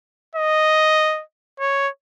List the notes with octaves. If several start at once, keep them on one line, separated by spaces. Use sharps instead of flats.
D#5
C#5